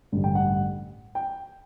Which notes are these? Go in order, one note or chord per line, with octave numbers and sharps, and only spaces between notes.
A1 G2 D3 G3
G5
F#5
G5